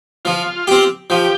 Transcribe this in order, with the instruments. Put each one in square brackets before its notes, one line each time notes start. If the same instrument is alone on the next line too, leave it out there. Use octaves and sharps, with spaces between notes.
[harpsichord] F3 [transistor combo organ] F4
[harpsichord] C4 G4
[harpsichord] F3 [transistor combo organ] G4